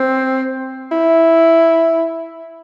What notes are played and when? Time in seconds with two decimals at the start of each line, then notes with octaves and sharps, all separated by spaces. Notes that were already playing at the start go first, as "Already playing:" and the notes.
Already playing: C4
0.92 E4